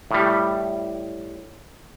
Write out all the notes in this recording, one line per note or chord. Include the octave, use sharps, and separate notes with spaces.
A2 G3